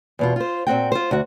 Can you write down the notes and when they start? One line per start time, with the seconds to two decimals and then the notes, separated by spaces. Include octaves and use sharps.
0.19 E2 B2 F4
0.36 F4 C5
0.67 A#2 C4 F#4 G5
0.92 F4 C5
1.11 D2 F#4